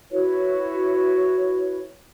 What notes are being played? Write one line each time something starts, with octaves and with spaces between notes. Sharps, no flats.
E4 F#4 B4 C#5